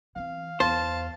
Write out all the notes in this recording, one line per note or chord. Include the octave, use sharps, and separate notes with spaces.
E3 C4 F5
E2 C5 F5 A5